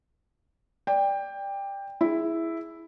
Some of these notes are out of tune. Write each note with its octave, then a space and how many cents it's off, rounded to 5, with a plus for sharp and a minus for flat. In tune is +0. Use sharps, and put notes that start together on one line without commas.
D5 +0 G5 +20
E4 +0 G#4 +10